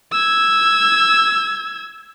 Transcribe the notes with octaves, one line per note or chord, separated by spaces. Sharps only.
E6 G#6